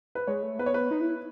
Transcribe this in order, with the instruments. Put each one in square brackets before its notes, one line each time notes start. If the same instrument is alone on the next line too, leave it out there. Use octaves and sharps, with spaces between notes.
[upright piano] B4
[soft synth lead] G#3 [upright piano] C#5
[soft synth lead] A3
[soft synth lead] B3 [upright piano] B4
[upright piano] C#5
B4
[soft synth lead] D#4
E4